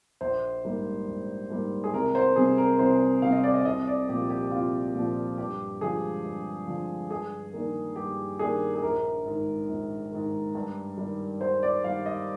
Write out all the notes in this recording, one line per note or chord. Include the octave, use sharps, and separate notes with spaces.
A#1 C5
G#2 G3 A#3
A#1
G#2 G3 A#3
G#4
C2 A#4
C5
C3 G3 C4 G#4
A#4
C2 C5
C3 G3 C4 F5
D#5
D5
D#5
C2 D#5
D5
A#2 F3 G4
G4
C2 F4
A#2 F3
G2 G4
D3 F3 G#3 G#4
G2
D3 F3 G#3
G2 G#4
D#3 A#3 D4
G2 G4
D#3 A#3 D4 G#4
G#4
A#1 A#4
G#2 D#3
A#1
G#2 D#3
G2
D#3 G3
G2 C5
D5
D#3 G3 F5
D#5